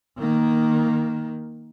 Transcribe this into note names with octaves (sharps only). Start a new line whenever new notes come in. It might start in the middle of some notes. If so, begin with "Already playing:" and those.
D#3 A#3